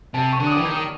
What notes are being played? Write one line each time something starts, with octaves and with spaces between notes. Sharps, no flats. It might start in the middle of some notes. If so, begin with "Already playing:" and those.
C3 A5
C#6
D3
D#6
D6
E3
D#3
D#6